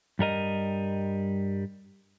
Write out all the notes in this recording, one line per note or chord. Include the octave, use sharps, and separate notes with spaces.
G2 G3 A#4 D#5